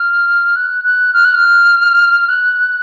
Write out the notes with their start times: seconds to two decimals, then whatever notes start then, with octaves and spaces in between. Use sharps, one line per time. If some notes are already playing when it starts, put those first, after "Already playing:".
Already playing: F6
0.56 F#6
0.85 F#6
1.13 F6
1.25 F#6
1.35 F6
2.29 F#6